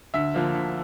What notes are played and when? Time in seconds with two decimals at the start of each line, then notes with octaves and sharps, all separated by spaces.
0.14 D2 E5
0.34 D3 F3 A#3
0.54 D2